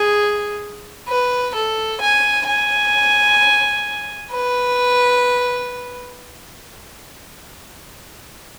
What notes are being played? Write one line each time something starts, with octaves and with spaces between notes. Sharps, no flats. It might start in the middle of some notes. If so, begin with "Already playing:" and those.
Already playing: G#4
B4
A4
G#5
G#5
B4